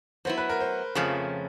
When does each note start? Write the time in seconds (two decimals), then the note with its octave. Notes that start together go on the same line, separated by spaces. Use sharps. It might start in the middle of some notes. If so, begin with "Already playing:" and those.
0.25 F#3 B3 E4 C5
0.37 B4
0.49 A#4
0.60 C5
0.95 F2 C#3 F3 A3 C#4